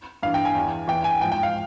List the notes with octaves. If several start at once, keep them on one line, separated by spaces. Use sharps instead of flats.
G2 E3 F5
G5
G#5
E2 E3
E2 E3 G5
G#5
G#2 F3 G5
G5
F5